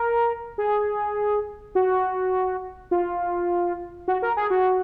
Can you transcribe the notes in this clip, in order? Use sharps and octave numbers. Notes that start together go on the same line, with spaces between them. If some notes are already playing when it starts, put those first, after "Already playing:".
Already playing: A#4
G#4
F#4
F4
F#4
A#4
G#4
F#4